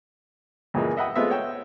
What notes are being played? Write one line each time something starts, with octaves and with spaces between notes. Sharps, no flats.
C#2 A#2 E3 G#3
D#5 E5 F#5 G5 B5 D#6
G#3 A3 B3 F4 C5 E5
C#5 G5 E6